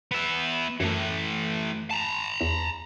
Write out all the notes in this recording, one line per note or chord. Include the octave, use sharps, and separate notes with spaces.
B3 E5
F#2 E3 A3
A5 A#5
E2